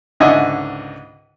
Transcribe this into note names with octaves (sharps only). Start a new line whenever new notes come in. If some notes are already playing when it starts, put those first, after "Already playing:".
C#2 G#2 D3 D#5 E5 G#5